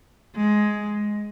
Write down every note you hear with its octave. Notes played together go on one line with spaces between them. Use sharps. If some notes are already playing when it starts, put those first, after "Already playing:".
G#3